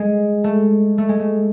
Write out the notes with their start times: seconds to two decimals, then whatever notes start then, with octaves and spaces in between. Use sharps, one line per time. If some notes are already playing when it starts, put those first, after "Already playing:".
Already playing: G#3
0.44 A3
0.98 A3
1.09 G#3
1.19 A3